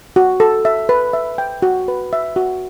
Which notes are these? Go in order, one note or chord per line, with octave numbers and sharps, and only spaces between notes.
F#4
A4
E5
B4
E5
G5
F#4
B4
E5
F#4